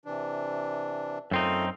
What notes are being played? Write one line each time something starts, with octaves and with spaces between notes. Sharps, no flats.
C3 E3 D4
F#2 A3 C4 D#4 F4 A4